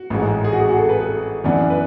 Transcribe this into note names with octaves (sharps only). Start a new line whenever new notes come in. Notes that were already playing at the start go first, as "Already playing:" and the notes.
Already playing: F#4
A1 G#2 G#3
G#4
F#4
G#4
F#4
A4
B4
G#4
F#2 E3 B3 D4
B4